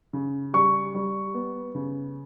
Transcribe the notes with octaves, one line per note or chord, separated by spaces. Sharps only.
C#3
G3 C#6
G3
B3
C#3